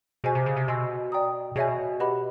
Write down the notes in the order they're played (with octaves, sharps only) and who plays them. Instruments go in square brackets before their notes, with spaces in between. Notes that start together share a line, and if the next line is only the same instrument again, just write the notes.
[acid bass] B2 [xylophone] G#4 C5 D#5 G#5
[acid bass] C3
C#3
C3
[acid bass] B2 [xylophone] D#5 G#5 C6 E6
[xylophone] D5 G5 A#5 D#6
[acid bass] B2 [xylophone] G#4 C#5 E5 G#5
[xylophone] G4 B4 D#5 F#5 B5